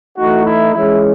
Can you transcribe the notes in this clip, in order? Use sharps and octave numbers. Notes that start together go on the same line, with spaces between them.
E3 A3 D#4 F#4
E4
E3 G#3 C#4 E4